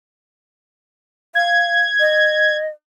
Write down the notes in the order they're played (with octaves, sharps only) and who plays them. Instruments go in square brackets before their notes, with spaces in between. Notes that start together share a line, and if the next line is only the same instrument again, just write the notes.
[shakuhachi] F5 [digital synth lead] G#6
[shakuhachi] D#5